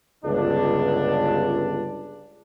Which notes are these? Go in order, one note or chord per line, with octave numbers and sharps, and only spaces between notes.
G1 C#2 D4